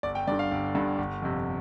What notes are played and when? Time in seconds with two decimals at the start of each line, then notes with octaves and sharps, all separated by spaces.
0.03 G1 D5
0.15 G5
0.27 G2 D3 D5
0.39 F5
0.51 G1
0.75 G2 D3
0.98 G1
1.22 F2 C3